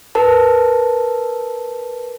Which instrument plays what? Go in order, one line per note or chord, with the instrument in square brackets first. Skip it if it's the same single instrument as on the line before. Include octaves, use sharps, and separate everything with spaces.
[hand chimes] A#4 B4 A5